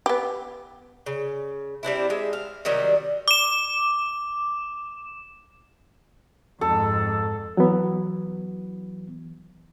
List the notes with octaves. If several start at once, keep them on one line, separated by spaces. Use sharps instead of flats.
B3 G4
C#3
G3 C4 D4 E4
G#3 E5
F5
C3 D#3 F#3 G3
D6 E7
F2 G#2 A4
E3 F#3 B3